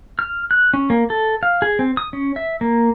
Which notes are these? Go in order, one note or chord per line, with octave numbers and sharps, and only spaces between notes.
F6
F#6
C#4
A#3
A4
F5
G#4
C4
D#6
C#4
E5
A#3